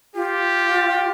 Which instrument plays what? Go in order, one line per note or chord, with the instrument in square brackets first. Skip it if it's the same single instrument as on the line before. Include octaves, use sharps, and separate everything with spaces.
[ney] F4 [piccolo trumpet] G4